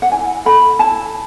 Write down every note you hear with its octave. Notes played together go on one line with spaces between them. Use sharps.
F#5
E4 G#5
A4 B5
E4 A5